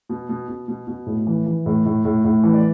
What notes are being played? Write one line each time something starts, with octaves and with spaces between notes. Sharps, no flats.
B2
B2
B2
B2
B2
A2
E3
E3
A2
A2
A2
A2
E3
D5